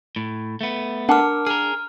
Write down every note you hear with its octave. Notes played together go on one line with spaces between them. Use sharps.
A2
A3 B3
D4 A#4 F#5 A5 D6 F6
G#4 A#4 F6